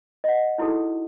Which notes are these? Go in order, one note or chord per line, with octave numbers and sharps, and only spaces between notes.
D#5 F#5
D#4 E4 F#4 G#4 A4